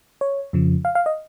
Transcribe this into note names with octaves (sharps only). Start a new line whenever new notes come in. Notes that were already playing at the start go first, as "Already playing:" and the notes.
C#5
F2 C#3 F3
F5
F5
D#5